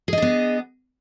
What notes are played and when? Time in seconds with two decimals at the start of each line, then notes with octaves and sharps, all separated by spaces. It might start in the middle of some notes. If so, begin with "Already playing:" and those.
0.08 G#4
0.13 D#5
0.18 D4
0.22 B3